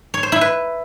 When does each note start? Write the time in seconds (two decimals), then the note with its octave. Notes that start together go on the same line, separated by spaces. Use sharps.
0.14 C#5
0.23 C5
0.32 E4
0.41 B4